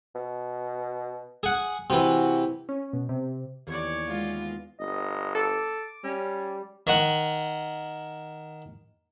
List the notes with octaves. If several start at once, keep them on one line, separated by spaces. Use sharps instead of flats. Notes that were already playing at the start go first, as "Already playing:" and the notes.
B2
G#4 F#5
C3 E3 F#4
C#4
B2
C3
D#2 E3 B3 C#5 D5
G#3 F4
G1 D#5
A4 D6
G3 C#4
D#3 F#5